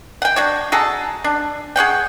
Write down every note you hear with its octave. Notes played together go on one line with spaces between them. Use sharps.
F#5 G5
D4 F#4 C#5
F#4 G#4 A4 A#5
D4
G#4 C#5 F#5 G5